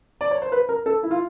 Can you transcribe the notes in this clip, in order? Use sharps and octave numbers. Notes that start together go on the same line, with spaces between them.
D5
C#5
C5
B4
A#4
A4
E4
F4